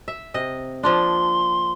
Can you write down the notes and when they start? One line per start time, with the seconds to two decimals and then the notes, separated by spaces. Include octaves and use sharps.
0.08 E5
0.34 C3 D#5
0.83 F3 A#3 D4 C6